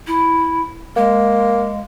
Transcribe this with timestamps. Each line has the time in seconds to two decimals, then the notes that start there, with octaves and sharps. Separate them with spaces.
0.07 E4
0.96 G#3 A#3